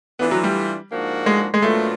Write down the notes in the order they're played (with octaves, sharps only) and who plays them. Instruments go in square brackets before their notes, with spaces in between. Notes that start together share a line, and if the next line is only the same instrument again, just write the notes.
[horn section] E3 A3 D4 F4 [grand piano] B3
[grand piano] F#3
G3
[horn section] G#2 F3 A#3 D4 F#4
[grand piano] G#3
G#3
[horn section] A#2 F#3 B3 D4 F4 [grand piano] A3